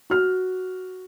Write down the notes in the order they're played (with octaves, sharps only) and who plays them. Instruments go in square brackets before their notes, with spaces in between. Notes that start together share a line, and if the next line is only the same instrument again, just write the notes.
[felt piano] F#4 F6